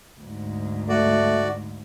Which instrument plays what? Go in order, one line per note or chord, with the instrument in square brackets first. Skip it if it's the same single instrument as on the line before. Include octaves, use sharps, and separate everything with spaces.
[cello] D2 G#2
[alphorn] A3 [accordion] F#4 D5